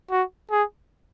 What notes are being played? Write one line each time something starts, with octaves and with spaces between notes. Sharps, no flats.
F#4
G#4